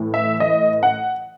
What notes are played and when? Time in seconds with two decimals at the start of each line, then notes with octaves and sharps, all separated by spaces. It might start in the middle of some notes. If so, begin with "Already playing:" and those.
Already playing: A2 E3
0.14 E5
0.40 D#5
0.83 F#5